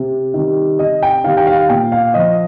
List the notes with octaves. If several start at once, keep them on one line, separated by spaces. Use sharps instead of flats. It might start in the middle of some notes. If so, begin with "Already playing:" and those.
Already playing: C3
D#3 G3
C3 D#5
G5
D#3 G3 F5
G5
F5
A#2 G5
F5
F3 D#5